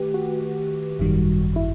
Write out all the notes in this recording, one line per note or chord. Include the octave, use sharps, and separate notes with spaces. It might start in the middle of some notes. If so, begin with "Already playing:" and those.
Already playing: D#3 A3 G4 B4
F#4
G#1 F#2 D#3 G3
E4